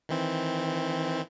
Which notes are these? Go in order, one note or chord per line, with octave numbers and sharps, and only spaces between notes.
D#3 E3 C4